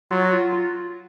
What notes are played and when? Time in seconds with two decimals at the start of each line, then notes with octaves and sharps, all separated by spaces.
0.11 F#3 F4
0.23 F#4
0.33 F4
0.53 F4